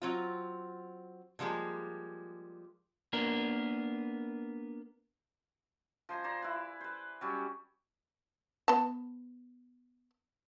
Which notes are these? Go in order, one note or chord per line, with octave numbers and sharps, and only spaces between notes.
F#3 C4 F4
B2 F3 G3 G#3 A#3
A#3 B3 D4 A#4
F3 C5 G#5 A#5
C5 D5 A#5
E4 B4
B4 C5
F#3 G3 C#4
B3 A5